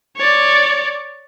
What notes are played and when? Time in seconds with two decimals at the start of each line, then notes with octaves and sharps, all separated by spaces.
0.17 C#5 D5